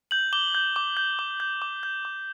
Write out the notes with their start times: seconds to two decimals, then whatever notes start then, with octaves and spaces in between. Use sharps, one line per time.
0.11 G6 F#7
0.33 D6 G7
0.55 G6
0.76 D6
0.97 G6
1.19 D6
1.40 G6
1.62 D6
1.83 G6
2.05 D6